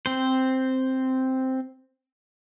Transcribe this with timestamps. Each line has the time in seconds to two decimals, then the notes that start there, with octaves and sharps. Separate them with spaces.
0.06 C4 C5